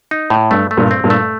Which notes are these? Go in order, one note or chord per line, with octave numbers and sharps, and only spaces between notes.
D#4
A2
G2 A3
A3
G2 A#2
C4
G2 A#2
A3